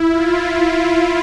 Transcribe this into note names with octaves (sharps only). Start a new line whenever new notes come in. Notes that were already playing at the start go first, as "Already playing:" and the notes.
Already playing: E4
F4